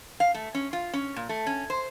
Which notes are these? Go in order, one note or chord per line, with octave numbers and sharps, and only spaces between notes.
F5
A3
C#4
F4
C#4
A#2
A3
C#4
C5